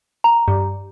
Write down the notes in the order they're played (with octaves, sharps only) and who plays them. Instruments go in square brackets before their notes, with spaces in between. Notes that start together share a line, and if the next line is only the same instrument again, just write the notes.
[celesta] A#5
[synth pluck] G2